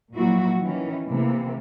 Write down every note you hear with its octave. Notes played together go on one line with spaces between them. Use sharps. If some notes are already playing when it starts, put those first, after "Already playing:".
A#2 F3 F#3 A#3 E4 F#4
D#3 E3 C#4
C3 E3 A3 A#3